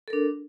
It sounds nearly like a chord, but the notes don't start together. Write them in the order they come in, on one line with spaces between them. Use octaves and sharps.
A4 A#4 D4